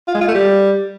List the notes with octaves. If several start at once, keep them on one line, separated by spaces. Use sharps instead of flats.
F4
G#3
F4
A3
G3